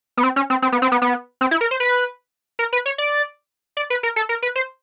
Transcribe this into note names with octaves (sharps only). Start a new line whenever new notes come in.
B3
C4
C#4
C4
C4
B3
C4
B3
B3
C4
E4
A#4
C5
B4
A#4
B4
C#5
D5
D5
B4
A#4
A4
A#4
B4
C5